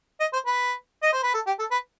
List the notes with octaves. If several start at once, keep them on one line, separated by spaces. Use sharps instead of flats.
D#5
C5
B4
D#5
C5
B4
A4
G4
A4
B4